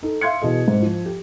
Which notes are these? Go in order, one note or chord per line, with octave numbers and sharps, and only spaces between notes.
D#4 A4
E5 F5 C6 G#6 C#7
B2 E3 G#4 D#5
G#2
F3
G4